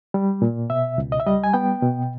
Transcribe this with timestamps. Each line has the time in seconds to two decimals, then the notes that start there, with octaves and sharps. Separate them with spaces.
0.14 G3
0.42 A#2
0.70 B2 E5
0.98 C#2
1.12 D#5
1.20 E5
1.27 G3 D#5
1.44 G#5
1.54 B3 G5
1.82 B2